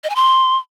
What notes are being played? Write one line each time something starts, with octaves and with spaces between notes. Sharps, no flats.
D#5
G#5
C6